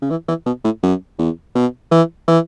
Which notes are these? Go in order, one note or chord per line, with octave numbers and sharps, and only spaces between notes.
C#3
E3
E3
B2
A2
F#2
E2
B2
E3
E3